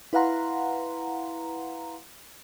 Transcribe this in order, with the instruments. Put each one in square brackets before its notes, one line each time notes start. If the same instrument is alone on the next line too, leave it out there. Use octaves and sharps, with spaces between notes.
[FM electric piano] E4 B4 F5 F#5 A#5 C6